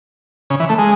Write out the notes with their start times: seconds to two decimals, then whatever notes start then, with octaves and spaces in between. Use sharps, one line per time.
0.50 C#3
0.60 E3
0.69 A3
0.78 G#3